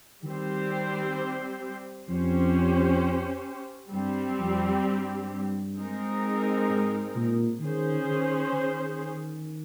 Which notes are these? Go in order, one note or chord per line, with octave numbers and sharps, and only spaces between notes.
D#3 G3 C4 G4 C5
F2 C#4 G4 C5
G2 G3 C4 G4
F2
G2
G#3 C4 D#4 A#4
G#2
A#2
D#3 C#4 G#4 C5
D#3
D#3